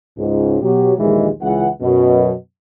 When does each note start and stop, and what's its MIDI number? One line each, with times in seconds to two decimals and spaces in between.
0.18 0.57 37
0.18 0.57 44
0.62 0.92 47
0.62 0.92 54
0.62 0.92 67
0.98 1.29 34
0.98 1.29 39
0.98 1.29 46
0.98 1.29 52
0.98 1.29 56
1.41 1.67 37
1.41 1.67 52
1.41 1.67 78
1.81 2.32 42
1.81 2.32 47